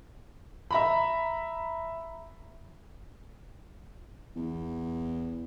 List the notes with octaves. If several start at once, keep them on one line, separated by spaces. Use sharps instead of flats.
E5 A#5 B5
E2